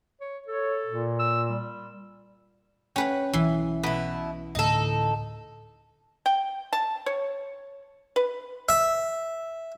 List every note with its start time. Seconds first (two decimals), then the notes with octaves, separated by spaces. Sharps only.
0.21 C#5
0.47 A4 C#5
0.87 A#2
1.19 E6
1.50 G3
2.96 C#4 B4 F#5 G5
3.33 B1 E3
3.83 B2 E4 B4
4.55 D2 A2 D3 D#4 A4
6.26 G5
6.73 A5
7.06 C#5
8.16 B4
8.69 E5